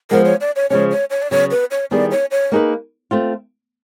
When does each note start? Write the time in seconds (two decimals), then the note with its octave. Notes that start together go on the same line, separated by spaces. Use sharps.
0.11 F3 G#3 B3 A#4
0.25 C#5
0.41 D5
0.56 C#5
0.70 C#3 F3 G#3 C#4 C#5
0.91 C#5
1.10 C#5
1.22 D5
1.31 C#3 F#3 B3 C#5
1.51 B4
1.71 C#5
1.91 D#3 G3 B3 E4 G#4 D5
2.11 C#5
2.31 C#5
2.52 A#3 D#4 G#4 B4
3.11 A3 C4 F4